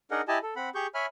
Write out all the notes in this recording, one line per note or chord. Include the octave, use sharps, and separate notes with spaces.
D4 D#4 G#4 A#4 D#5 F#5
E4 G4 D#5 G#5 A5
A4
C4 F#5 B5
G4 G#4 C#6 G6
C#5 E5 G#5 B5 F6